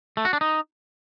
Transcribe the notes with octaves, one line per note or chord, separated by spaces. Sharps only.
A3
F#4
D4
D#4